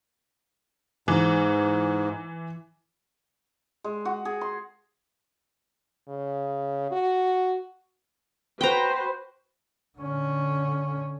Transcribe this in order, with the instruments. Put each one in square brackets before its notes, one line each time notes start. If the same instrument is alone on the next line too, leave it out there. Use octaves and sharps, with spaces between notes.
[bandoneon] G#2 [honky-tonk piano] E3
[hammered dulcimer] G#3
F#4
G#4
C6
[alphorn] C#3
F#4
[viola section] F#4 B4 C5 [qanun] G5 A#5
[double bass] D3 C#4